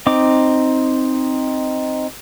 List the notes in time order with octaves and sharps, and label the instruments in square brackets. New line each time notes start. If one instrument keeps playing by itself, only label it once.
[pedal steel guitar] C4 D#4 D6